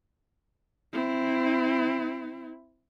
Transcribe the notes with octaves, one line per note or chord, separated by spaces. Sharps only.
C4 E4